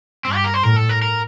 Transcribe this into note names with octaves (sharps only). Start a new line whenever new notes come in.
G2 C4
G4
A#4
C5
A2 A#4
A4
A#4
A#4